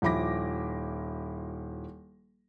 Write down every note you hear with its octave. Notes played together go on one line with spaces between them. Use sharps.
D#1 F3 E4 B5 D6 A#6